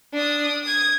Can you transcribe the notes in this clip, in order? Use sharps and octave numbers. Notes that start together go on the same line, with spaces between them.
D4 D#6
D#6 G#6